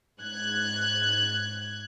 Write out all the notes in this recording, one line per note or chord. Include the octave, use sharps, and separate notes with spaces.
G#2 F#6 G#6